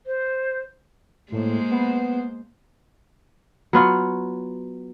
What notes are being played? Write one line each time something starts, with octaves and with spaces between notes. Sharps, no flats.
C5
A2 G#3 A#3 C5
B3
F#3 B3 F4